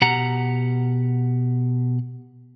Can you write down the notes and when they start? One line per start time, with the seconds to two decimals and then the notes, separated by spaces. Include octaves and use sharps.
0.02 B2 G4 F#5 A#5